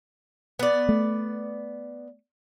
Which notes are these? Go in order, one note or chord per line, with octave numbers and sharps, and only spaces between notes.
B3 D5
A3